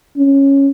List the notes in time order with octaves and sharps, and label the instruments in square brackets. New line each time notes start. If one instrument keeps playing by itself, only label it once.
[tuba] C#4